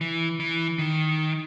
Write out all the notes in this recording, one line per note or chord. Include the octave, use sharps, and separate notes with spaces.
E3
E3
D#3